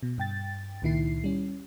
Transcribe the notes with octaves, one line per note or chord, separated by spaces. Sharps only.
B2
G2 G5 A6
C#2 A#2 D#3 E4 C7
G3 C#4